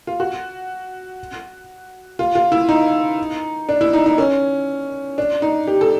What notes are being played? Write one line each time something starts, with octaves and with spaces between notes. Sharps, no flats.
F4
F#4
F4
F4
E4
D#4
D4
E4
D#4
D#4
C#4
D4
D#4
G4
A4